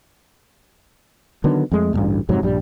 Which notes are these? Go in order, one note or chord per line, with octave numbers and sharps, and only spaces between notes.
D3 D#3 F#3 B3
F2 G#3 A3
A1 D2 G2 B2
F2 G#2 C3 F#3
A#1 G2 G3